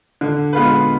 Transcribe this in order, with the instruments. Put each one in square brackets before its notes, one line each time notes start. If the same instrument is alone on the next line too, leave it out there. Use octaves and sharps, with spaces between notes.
[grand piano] D3
G#3 B3 F4 B4